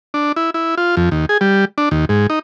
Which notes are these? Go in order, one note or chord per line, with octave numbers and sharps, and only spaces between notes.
D4
E4
E4
F4
F2
D#2
G#4
G3
D4
D#2
G#2
D#4